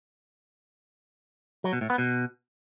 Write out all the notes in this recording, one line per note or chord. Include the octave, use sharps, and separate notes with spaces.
F#3
B2
A2
B3
B2